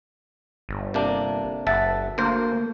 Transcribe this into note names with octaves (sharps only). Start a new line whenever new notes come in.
G1
C3 A#3 D4
F#1 E5 F#5 A5
D2 A#3 C5